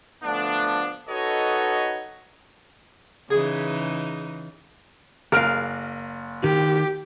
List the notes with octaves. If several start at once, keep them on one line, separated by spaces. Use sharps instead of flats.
D3 F3 A3 B3 D4
D#4 F#4 A4 B4 C#5 D#5
C#3 E3 D#4 G#4
F#1 A#4 F5 F6 D7
D#3 G4